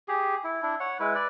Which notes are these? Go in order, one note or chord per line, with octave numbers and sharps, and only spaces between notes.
G4 G#4
E4
D4 E4
C#5 F#5
G#3 E4 B4
B4 D5